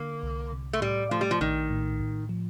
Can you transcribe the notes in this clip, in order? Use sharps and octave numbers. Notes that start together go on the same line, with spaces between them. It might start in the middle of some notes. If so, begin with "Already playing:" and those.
Already playing: D3 A#3
C2
C3
A3
A2 G3
F3 A3
G3
F3
A#1 D#3
A2
A2
F3